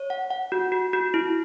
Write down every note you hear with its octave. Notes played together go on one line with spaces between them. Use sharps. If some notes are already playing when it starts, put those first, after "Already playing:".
Already playing: C#5
F#5
F#5
F#4
F#4
F#4
E4